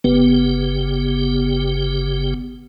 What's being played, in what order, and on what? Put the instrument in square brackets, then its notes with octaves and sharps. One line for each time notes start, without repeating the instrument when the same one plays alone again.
[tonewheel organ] G1 C#3 G4 [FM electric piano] B3